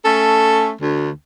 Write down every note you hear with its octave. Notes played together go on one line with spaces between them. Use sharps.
A3 C#4 A4
D2